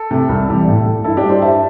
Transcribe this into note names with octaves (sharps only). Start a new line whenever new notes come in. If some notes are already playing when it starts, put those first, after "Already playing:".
Already playing: A4
C3 A3
C2
C3 E3 G3
A2
A3
G2 E4 A4
D4 G4
G3
G4 C5
G2 E5 A5